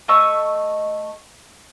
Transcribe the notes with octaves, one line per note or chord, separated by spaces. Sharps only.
A3 D#5 C#6 E6